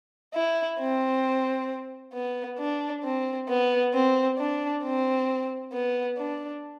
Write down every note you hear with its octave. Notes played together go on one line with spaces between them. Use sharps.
E4
C4
B3
D4
C4
B3
C4
D4
C4
B3
D4